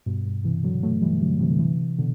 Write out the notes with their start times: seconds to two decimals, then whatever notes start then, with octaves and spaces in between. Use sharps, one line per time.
0.06 G2 B2
0.25 G2
0.44 C3 E3
0.64 D3 F#3
0.83 F#3 A3
1.02 E3 G3
1.22 D3 F#3
1.40 C3 E3
1.51 D3
1.59 C3 E3
1.98 B2 D3